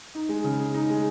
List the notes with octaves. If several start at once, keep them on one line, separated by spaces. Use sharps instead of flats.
D#4
G#3
C#3
G#4
D#4
G#3